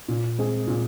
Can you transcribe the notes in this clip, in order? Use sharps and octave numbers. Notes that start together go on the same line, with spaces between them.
A#2
G#3 C4 G#4
A#2